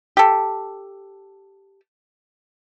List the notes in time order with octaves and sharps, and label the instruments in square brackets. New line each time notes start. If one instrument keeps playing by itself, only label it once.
[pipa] G4 A4